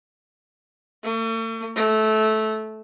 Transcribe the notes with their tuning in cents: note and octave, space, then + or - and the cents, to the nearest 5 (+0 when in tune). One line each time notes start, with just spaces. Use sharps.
A3 +45
A3 -15